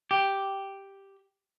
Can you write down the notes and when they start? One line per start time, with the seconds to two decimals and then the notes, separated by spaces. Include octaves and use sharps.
0.11 G4